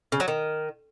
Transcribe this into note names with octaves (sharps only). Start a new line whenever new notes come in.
C#3
F#3
D#3